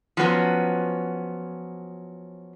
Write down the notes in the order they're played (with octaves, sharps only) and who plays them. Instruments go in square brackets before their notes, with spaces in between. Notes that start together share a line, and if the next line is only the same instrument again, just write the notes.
[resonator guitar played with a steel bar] F3 F#3 B3 C#4